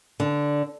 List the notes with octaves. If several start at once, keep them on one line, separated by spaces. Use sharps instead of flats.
D3